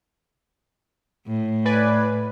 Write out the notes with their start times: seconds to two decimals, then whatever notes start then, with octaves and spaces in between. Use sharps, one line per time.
1.27 A2
1.65 B4 D5 G#5